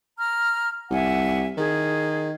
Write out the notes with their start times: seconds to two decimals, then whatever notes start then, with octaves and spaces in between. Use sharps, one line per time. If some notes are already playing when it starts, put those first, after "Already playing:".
0.17 A#5 F6
0.91 C2 E5 F#5 G#5
1.57 D#3 G#4